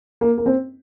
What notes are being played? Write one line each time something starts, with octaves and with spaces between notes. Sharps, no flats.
A#3
A#3
C4